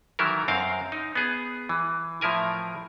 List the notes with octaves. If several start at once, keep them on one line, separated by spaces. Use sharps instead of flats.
D#3 E3 F#3 E4 A4 A#4
F#2 C4 A#4 F5
D#4
B3 G#4
E3
A2 F3 E4 A#4 G#5